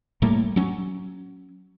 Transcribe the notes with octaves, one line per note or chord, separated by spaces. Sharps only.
A2 G3 A3 A#3
F#3 C#4